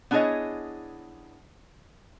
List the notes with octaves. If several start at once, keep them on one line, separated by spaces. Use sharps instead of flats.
B3 D4 E4 G#4 C#5 D#5